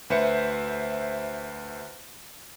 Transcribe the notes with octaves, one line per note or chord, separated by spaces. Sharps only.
D2 B4 C5 E5 C#7